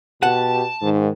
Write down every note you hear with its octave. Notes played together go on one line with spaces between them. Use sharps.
B2 G4 F#5 A5
G#2 D#3